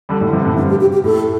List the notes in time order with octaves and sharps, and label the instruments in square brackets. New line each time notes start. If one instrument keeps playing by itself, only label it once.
[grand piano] D3 G3
A2 D3
G2 C3
A2 D3
[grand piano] G2 C3 [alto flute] D4
[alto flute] G4
G4
G4
[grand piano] A2 [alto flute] A4